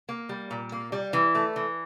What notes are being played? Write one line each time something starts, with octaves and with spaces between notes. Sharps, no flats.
A#3
G3
A#2
A#3
G3
E3
A3
E3